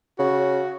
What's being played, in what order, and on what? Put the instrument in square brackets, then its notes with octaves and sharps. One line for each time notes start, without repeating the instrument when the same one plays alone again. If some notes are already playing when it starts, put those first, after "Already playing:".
[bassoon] C#3 [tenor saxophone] F#4